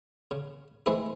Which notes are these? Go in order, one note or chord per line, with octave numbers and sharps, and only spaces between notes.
C#3
E3 G#3 A3 C4 E4 G#4